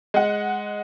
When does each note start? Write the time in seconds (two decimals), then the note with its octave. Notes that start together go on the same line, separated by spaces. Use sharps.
0.14 G#3 F#5